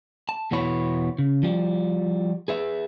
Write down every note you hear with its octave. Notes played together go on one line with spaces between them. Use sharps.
A5
E2 B2 B3 E4 C#5 B5
C#3
F3 G3
G#4 B4 E5